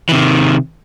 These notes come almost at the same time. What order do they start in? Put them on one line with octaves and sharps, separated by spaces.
E3 C3 D#3